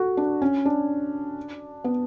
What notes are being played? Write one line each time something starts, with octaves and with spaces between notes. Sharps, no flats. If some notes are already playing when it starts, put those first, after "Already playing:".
Already playing: F#4 A4
D4
C#4
D4
B3